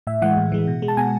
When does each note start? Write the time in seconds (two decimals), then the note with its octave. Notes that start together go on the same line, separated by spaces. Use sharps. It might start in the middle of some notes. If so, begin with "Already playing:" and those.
0.07 A2 E5
0.22 E3 G#3 F#5
0.37 A2
0.52 E3 G#3
0.67 B2
0.82 G#3
0.88 A5
0.97 B2 G#5